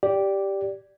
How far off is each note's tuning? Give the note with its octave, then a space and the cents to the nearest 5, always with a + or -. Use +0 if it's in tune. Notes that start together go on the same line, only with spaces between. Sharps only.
G4 +0 D5 -5